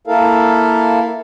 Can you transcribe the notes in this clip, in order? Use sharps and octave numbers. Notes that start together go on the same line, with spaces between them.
A#3 E4 A4 A#4 F5